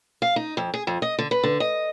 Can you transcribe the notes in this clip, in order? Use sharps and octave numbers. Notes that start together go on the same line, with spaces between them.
F5
D#4
F2
G#4
F2
D#5
D3
B4
D3
D#5